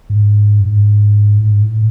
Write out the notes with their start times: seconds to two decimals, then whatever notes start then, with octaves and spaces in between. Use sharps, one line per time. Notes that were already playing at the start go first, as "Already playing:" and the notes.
0.10 G#2
0.60 F#2
0.66 G#2
1.38 A2
1.44 G#2
1.62 A2